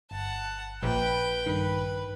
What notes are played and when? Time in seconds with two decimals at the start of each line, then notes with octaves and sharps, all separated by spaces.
0.11 G1 F#5 A5
0.83 A#1 B4 G5
1.46 G2 D#3 B4